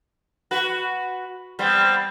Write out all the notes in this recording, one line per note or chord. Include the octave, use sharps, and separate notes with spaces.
F#4 B4
G3 B3 C4